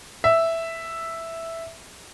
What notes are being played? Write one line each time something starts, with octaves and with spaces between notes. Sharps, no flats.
E5